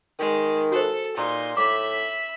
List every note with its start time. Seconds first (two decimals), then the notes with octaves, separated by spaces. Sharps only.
0.19 D#3 G#3
0.72 F#4 A4 C5
1.17 A#2 D#4 C6
1.57 A2 E5 B5 D6